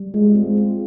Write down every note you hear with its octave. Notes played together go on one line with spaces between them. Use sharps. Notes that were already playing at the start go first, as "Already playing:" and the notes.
Already playing: G3
G#3 F4
C4
G#3
F4